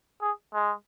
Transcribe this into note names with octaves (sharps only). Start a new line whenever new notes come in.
G#4
G#3